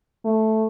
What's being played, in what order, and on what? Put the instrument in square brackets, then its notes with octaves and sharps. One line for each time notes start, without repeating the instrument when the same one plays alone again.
[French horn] A3